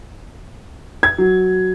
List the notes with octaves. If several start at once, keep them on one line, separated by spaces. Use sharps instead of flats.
G#6
F#3